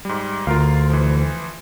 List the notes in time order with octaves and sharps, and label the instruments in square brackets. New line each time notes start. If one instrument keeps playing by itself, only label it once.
[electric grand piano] G#2 G3
[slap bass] D2 [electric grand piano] F4 A#4 F5
[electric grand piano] E3 F3